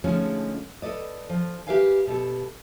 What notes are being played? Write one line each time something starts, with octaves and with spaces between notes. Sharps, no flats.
D3 F3 G#3 A3 C#4 D#4
A4 B4 D5 D#5
F3
G4 A#4 B4 E5 F5 G#5
B2 G4 A4